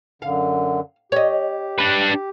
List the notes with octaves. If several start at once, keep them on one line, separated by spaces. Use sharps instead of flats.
F#2 D3 F5
G4 C#5 D#5
D4 B4